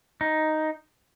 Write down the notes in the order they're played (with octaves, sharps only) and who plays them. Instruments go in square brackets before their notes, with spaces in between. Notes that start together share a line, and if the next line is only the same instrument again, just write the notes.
[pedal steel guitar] D#4